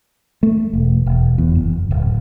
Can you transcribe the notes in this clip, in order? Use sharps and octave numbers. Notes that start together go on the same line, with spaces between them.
A3
E1
E1
E2
F#1
D1